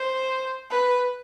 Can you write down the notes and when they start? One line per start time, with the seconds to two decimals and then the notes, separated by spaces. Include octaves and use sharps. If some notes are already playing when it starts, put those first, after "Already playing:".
Already playing: C5
0.71 B4